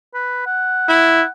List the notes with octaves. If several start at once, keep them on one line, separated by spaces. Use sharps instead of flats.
B4
F#5
E4